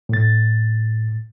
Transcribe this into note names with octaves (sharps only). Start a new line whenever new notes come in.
A2 A6